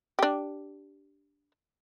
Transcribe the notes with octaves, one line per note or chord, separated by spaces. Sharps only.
D4 G4